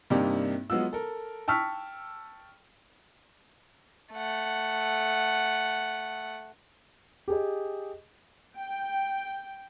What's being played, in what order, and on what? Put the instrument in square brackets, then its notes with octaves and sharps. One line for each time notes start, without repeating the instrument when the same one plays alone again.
[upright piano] G2 C3 A#3 D4 D#4 G4
F#3 G#3 B3 F4 E6
A4 A#4
G5 A5 C#6 E6 F6 B6
[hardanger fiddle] A3 F#5
[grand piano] G4 G#4 D#5
[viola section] G5